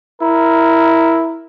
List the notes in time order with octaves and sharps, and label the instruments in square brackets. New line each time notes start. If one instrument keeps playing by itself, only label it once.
[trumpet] E4 [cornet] A#4